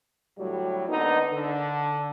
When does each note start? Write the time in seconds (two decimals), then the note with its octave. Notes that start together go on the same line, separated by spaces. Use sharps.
0.38 A2 D3 F#3 G3
0.88 D3 A#3 B3 D#4
1.32 D3